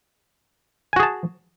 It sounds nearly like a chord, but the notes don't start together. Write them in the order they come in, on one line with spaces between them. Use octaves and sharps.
G#5 F#4 G#4 A5